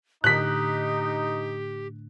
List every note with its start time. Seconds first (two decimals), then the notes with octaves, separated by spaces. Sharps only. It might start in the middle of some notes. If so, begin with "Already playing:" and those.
0.24 A2 D3 D#4 G4 F#6 B6